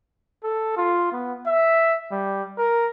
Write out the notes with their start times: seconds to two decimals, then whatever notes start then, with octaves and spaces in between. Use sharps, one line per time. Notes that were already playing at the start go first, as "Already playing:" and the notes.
0.43 A4
0.77 F4
1.12 B3
1.47 E5
2.12 G3
2.58 A#4